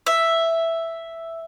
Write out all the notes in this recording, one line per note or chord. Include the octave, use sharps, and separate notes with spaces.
E5